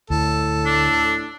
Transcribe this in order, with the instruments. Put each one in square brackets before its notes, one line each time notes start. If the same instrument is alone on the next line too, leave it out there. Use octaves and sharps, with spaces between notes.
[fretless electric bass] D2 [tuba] A2 [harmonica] A4
[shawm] D4